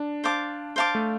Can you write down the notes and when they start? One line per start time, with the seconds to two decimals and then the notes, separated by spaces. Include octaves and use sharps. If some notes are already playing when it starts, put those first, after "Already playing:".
Already playing: D4
0.24 C5 F5 A5 D6
0.76 C5 F5 A5 D6
0.95 A3